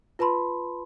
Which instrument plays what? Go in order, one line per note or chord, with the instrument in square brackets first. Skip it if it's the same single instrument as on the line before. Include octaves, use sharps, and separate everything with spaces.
[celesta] F4 B4 A5 B5 C6